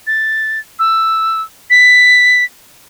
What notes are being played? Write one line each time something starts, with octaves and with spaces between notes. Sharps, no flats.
A6
E6
B6